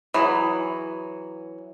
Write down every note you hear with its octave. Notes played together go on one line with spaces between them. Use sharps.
E3 F#3 G#4